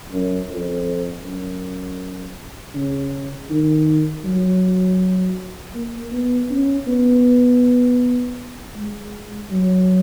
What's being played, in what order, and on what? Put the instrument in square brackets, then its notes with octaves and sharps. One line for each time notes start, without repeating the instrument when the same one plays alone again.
[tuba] F#2
F2
F#2
C#3
D#3
F#3
A#3
B3
C#4
B3
G#3
F#3